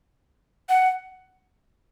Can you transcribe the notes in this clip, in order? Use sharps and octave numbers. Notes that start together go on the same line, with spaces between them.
F#5